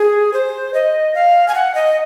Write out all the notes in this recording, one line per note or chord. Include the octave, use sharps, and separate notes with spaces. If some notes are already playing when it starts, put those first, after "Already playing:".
Already playing: G#4
C5
D#5
F5
G#5
F#5
D#5